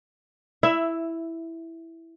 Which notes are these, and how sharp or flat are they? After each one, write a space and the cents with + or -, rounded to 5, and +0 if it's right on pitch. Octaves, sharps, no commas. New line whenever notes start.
E4 +0 E5 +15